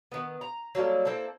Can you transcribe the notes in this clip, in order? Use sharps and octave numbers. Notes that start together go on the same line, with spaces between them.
D#3 B3
A#5
F#3 G3 A#3 A4
A#3 C4 E4 A4